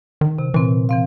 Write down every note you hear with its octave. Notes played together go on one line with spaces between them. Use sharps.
D#3
C3
A#2 E3 C4
E3 C4 F5